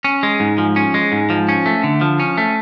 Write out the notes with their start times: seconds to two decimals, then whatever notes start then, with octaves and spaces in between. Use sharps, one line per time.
0.04 C#4
0.23 G#3
0.40 G#2
0.58 F3
0.76 C#4
0.94 G#3
1.12 G#2
1.30 F3
1.49 C#4
1.66 A3
1.84 D3
2.01 F3
2.20 C#4
2.38 A3